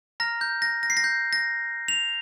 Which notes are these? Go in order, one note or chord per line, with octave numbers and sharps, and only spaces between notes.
A#5 F6 A#6
G6
A#6
A#6
C7
A#6
G6
A#6
F7